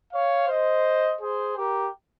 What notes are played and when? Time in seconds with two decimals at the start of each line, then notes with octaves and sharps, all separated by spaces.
0.12 C#5 F5
0.48 C5 D#5
1.20 G#4 C5
1.56 G4 A#4